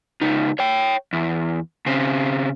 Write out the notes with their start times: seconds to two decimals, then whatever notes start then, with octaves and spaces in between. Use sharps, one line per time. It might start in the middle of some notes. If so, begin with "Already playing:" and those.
0.21 C#2 D#4
0.59 C#5 G5
1.13 E2
1.86 C#3 C4